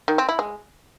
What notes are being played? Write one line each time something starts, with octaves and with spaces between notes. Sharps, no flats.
D#3
C4
E4
G#3